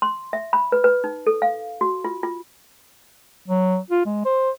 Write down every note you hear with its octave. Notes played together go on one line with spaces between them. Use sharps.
C6
E5
B5
B4
B4
D#4
A4
F5
F#4
F4
F4
F#3
F4
G#3
C5